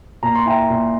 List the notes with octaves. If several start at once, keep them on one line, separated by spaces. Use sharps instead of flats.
A#2 A#5
C6
E4 G5 A#5
A#2